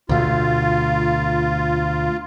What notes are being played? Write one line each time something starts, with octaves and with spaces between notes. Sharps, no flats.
D2 B2 A3 F4